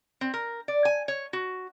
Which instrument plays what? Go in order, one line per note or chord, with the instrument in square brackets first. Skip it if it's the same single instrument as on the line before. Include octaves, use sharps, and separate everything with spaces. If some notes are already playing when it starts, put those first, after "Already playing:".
[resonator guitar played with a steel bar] C4
A#4
D5
G#5
C#5
F#4